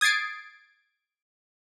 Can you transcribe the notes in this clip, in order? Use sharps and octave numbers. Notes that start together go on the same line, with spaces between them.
D#6 G#6 A6 C7 D7